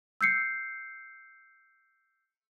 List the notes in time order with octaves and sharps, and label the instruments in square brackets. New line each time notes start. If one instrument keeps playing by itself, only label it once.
[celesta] E6 G6 C7 C#7